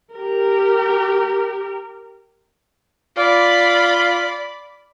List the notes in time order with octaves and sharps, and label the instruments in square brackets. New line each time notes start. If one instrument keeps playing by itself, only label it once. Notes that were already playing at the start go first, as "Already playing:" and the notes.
[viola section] G4 A#4
[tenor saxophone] F4 [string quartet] D5 B5